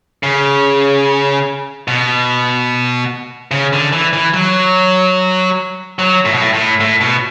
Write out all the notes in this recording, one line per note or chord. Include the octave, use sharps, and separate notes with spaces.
C#3
B2
C#3
D3
E3
E3
F#3
F#3
A2
B2
A2
A2
A2
B2